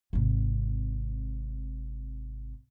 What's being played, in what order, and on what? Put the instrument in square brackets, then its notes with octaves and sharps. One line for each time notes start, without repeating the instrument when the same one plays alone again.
[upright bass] G#1 C3